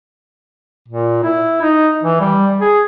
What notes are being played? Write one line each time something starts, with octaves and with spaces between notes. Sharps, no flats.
A#2
E4
D#4
E3
G3
G#4